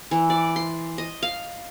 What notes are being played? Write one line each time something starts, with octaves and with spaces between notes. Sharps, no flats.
E3
D5
C6
D#5
F5